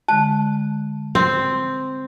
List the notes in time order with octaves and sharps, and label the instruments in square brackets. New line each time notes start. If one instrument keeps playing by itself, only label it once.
[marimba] D3 G#3 F#6 [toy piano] A5
[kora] C4